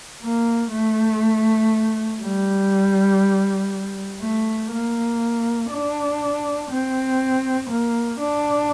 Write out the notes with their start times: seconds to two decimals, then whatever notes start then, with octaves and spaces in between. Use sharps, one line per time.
0.23 A#3
0.72 A3
2.22 G3
4.21 A3
4.71 A#3
5.71 D4
6.70 C4
7.69 A#3
8.19 D4